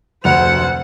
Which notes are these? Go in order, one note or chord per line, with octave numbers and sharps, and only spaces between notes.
F1 D2 C5 F#5 F7